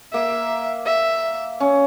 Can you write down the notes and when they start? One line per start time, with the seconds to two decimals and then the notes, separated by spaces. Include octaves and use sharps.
0.13 A#3 E5
0.86 E5
1.60 C#4